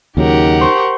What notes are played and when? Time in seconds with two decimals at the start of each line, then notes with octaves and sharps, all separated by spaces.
0.17 D#2 C#3 F#3 D#4 G4 A#4 F#5
0.61 C5 C6 C#6